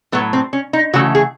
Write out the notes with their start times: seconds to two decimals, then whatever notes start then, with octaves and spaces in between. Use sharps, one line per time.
0.12 A2 F#3 A3 B3
0.33 C4
0.53 C#4
0.73 D#4
0.93 C#3 E3 A3 F#4
1.15 G#4